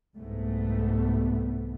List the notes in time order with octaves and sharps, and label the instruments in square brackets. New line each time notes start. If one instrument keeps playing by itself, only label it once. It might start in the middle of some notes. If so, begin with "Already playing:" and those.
[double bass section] C2 G#2 G3 A3 B3